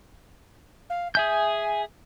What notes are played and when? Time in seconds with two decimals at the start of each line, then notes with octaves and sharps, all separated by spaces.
0.89 F5
1.15 G#4 E5 G#5 G6